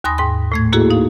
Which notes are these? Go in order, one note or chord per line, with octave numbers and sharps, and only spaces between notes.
D#2 G#5 B5 C6 D#6 A#6
G#2 G5 C6
A2 A3 G#6
A#3 E4 F#4 G#4 A4
D#4 F5